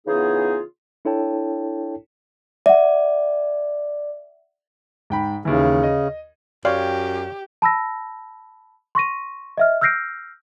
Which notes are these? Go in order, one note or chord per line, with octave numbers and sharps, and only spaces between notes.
C#3 E3 B3 D#4 F4 G#4
D4 E4 A4 C#5 G5 A5
D5 E5 F#5
G#2 G5 B5
D#2 C#3 E3
D#5
F#2 G4 C#5 D5 F5 G5 C6
A5 B5 E6 A#6
C6 C#6 A#6 D#7
D#5 E5 F6
E6 F6 G6 A#6 C7 D7